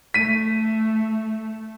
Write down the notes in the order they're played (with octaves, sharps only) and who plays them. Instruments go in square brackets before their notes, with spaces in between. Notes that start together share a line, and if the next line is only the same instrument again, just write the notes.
[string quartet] A3 [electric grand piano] B6 D#7